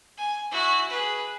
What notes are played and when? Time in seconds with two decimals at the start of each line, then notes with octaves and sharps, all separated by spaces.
0.17 G#5
0.51 E4 F#4
0.90 G#4 B4